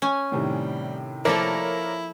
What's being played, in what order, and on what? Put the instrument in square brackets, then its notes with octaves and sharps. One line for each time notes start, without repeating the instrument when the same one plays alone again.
[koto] C#4 G#5
[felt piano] A2 C3 D#3 [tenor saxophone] G3
[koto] F3 A#3 A4 [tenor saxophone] E4 [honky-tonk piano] A#4 C#5 D5